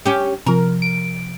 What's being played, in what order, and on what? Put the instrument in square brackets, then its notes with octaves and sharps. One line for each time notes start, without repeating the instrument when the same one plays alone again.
[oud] C#4 G4
[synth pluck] C3 F3 [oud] A#4
[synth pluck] D7